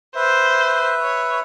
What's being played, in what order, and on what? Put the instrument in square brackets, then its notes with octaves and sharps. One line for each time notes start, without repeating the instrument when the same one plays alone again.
[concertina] B4 E5 [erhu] C5
[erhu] C#5